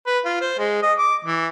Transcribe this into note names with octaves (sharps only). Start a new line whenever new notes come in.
B4
F4
C5
G#3
D#5
D6
E3